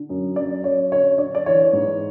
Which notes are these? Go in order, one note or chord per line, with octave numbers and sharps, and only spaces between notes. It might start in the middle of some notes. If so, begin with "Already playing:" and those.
Already playing: D3
F#2
F#2 D5
F#2 C#5
D3 C#5
D3 D5
D5
E3 C#5
G#2